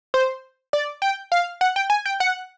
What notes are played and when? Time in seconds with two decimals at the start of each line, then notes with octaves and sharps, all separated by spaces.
0.14 C5
0.73 D5
1.02 G5
1.32 F5
1.61 F#5
1.76 G5
1.90 G#5
2.06 G5
2.20 F#5